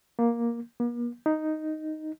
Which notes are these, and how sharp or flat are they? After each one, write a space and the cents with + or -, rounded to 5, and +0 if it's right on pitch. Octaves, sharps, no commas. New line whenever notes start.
A#3 +10
A#3 +45
D#4 +0